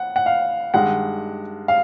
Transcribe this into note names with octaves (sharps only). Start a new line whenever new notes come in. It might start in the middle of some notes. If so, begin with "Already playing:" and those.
Already playing: F#5
F#5
F5
G2 D#3 G#3 F#5
F5